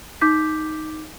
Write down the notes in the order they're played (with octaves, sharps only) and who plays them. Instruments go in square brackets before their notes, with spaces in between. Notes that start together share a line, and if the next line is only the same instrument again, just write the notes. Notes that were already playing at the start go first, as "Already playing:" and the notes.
[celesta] D#4 D6 G6 B6